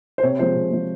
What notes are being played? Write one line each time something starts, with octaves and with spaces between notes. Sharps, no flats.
C5
C3 C#5
F3 G#3 C5
C3
F3 G#3